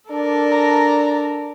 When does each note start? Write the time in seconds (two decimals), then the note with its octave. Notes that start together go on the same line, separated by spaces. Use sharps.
0.11 D4 A4 A#4 D5
0.51 A#5